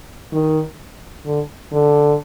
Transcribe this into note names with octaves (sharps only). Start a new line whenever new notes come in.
D#3
D3
D3